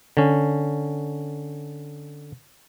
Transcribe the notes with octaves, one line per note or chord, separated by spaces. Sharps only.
D3 C#4